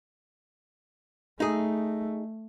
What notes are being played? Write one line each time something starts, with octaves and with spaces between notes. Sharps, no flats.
A3 D#4 G#4